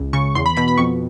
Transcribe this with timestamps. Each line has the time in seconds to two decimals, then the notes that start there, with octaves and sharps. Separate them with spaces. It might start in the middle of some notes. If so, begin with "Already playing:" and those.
Already playing: C#2
0.13 C#3 C#6
0.35 E2 C6
0.46 B5
0.57 B2 B5
0.68 B5
0.78 F2 C#6